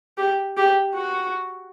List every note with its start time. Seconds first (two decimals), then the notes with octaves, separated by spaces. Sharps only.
0.18 G4
0.57 G4
0.95 F#4